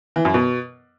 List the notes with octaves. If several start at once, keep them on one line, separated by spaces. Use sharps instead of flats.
E3
F#2
B2